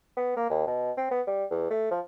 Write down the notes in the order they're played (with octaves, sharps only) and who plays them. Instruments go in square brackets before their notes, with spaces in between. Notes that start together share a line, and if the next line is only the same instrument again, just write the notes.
[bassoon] B3
A#3
D#2
B2
C4
B3
G3
E2
A3
F3